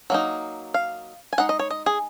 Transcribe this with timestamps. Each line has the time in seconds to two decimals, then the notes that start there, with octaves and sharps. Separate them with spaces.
0.10 F#3 A#3 D#4
0.74 F5
1.33 G#5
1.38 G#3 D#4 F#5
1.49 D#5
1.59 C#5
1.70 D#5
1.86 G#4